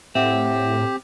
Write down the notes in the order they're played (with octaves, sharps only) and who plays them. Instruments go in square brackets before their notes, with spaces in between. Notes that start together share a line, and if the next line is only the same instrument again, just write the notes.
[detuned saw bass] A2 [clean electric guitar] C4 [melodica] G4 [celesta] E5 F#5